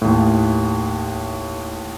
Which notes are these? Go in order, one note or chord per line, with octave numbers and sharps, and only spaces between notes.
D#2 A2